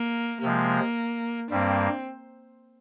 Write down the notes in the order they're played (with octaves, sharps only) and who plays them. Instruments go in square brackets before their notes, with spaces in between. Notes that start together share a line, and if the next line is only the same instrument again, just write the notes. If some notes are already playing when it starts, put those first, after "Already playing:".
Already playing: [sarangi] A#3
[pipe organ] C3 F3 G#3 [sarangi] A#3
[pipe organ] G2 G3 A#3 [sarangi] C4